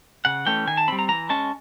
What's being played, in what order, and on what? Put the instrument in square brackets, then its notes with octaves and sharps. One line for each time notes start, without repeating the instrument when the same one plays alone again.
[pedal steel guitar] C#3 F#5
E3 A3 C#4 G5
D#3 G#5
A5
G3 C4 B5
A#5
E3 A#5
G#3 C#4 A5